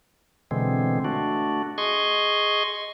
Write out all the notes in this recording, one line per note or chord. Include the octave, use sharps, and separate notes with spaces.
B2 D3 E3 G#3 C4
A3 D4 F#4
G#4 D#5 C6 C#6